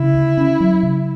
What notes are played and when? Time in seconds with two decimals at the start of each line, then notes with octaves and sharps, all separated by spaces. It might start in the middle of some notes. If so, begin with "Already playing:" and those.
Already playing: C#3 E4
0.14 D2
0.37 C#4
0.60 F#3
0.83 C#3